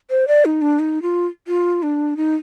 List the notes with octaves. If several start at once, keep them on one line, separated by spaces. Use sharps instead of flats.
C5
D5
D#4
D4
D#4
F4
F4
D4
D#4